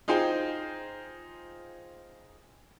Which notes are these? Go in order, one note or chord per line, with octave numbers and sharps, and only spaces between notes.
D#4 F4 G#4 C5 G5